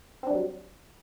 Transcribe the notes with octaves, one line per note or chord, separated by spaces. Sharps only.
F#3 G3 C4 D4